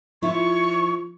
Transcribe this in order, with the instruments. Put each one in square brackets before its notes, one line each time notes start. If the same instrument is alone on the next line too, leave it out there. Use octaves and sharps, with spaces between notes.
[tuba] F3 [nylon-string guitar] E4 F4 [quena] C#6